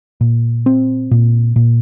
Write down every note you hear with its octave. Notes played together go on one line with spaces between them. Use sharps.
A#2
C4
A#2
A#2